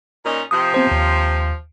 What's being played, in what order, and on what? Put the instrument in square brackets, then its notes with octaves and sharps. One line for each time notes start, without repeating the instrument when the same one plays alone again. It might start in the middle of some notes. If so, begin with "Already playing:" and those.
[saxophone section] A#2 C#4 D#4
[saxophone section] C3 F3 [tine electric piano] D#6
[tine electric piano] B3 C4 C5
D#2